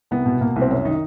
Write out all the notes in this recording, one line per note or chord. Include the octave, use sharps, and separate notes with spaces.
C2 B3
B2
B2 A#3
C2
C4
F#2 C#4
D#3 D#4